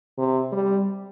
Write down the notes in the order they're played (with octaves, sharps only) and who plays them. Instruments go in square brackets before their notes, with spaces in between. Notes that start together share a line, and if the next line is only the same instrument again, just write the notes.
[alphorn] C3
G3